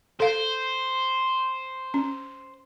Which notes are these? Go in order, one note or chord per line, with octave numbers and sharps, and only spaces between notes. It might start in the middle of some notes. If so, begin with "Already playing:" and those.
A4 C5 F5
C#4